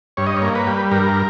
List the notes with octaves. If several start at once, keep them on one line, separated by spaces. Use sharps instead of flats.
G2 C#5
D#5
C#5
A#3
B4
G3
G2 A#4